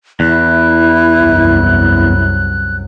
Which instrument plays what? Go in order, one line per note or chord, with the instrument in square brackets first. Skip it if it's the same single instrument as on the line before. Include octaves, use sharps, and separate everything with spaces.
[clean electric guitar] E2 [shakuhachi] E4 [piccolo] F#6
[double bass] C2 F#2